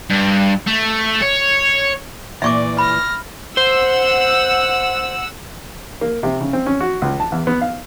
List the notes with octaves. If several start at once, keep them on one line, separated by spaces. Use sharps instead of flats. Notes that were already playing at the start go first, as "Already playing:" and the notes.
G2
A3
C#5
A#2 E3 D5 E5 C#6 D6
B5 F6 A#6
C5 F#5 E6
A#3
C3
C#3
C4
C#4
F#4
C#2
A5
E2
B3
F5